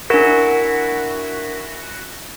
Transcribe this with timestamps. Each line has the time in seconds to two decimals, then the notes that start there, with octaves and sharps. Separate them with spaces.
0.10 D4 E4 F#4 A#4